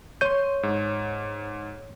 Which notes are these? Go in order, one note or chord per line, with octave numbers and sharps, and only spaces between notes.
C#5 C6 G6 D#7
G#2